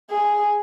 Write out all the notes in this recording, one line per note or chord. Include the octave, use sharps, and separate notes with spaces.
G#4